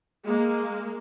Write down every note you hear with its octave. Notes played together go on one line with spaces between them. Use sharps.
G#3 A#3